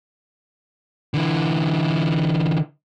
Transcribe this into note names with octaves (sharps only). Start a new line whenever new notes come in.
D3 E3